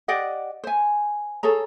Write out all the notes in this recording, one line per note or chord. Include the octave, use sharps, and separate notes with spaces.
G4 D5 D#5 F#5
C5 G#5
G#4 A4 C#5 A#5